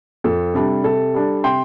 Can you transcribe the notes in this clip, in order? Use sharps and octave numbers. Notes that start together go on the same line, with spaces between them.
F2 A4
C3 G3 D4
C3 A4
G3 D4
C3 G5 C6